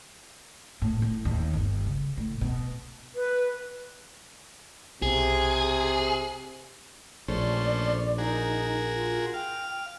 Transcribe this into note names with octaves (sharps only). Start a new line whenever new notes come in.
A2
A2
D#2
G1
C#3
A2
B2
B4
B1 C3 G#4
A#1 A#2 A3 C#4 C5 D5
D#4 F#4 G#4 A#4
F4
F5 G5